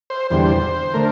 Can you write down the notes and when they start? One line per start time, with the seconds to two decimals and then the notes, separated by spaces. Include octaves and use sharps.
0.10 C5
0.31 E2 D3 G3 C5
0.94 D3 A3 A#4